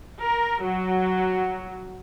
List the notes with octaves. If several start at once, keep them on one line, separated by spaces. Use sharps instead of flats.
A#4
F#3